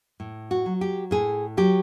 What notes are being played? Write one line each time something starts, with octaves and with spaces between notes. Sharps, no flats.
A2
F#4
F#3
G4
A2 G#4
F#3 G4